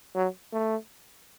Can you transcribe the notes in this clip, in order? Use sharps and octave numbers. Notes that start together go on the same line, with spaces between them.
F#3
A3